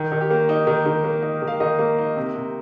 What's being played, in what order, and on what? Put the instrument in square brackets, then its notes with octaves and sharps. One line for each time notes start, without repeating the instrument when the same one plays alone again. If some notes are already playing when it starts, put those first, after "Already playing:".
Already playing: [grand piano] D#3
D#3
G4
A#3
D#4
D#3
D#3
A#3
D#4
D#3
F5
D#3 D#5
A#3
D#4
C3
C3